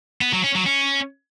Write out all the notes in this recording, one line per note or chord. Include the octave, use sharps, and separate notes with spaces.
B3
F#3
C#4
F#3
C#4